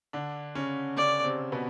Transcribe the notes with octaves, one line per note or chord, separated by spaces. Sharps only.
D3 D4
C#3 C#4
C#3 C#4 D5
C3 C4
B2 B3